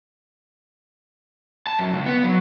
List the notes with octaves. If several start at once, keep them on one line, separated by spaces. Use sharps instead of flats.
A5
F#2
C#2
B3
F#3